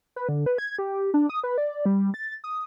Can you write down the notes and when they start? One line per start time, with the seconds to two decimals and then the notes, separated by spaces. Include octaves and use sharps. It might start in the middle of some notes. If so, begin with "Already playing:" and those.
0.16 B4
0.29 D3
0.46 B4
0.58 G#6
0.79 G4
1.14 D4
1.29 D#6
1.44 B4
1.58 D5
1.86 G3
2.14 A6
2.44 D#6